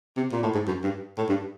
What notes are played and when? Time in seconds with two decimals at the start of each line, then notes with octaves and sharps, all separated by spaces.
0.17 C3
0.32 A#2
0.43 A2
0.54 G#2
0.67 F#2
0.84 G2
1.17 A2
1.29 G2